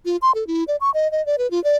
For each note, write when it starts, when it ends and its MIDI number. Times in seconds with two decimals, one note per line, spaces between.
0.05 0.17 65
0.22 0.31 84
0.35 0.46 69
0.47 0.64 64
0.68 0.76 74
0.81 0.90 85
0.94 1.10 75
1.11 1.24 75
1.26 1.36 74
1.38 1.50 71
1.51 1.62 65
1.64 1.77 74